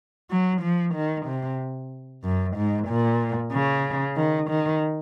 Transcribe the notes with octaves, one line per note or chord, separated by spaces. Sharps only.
F#3
F3
D#3
C3
F#2
G#2
A#2
C#3
D#3
D#3